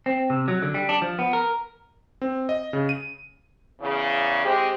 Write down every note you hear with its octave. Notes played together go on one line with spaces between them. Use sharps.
C4
C3
F#3
D3
G3
D4
F3
B3
A#4
C4
D#5
C#3
D#7
E2 C#3
G#3 C4 G4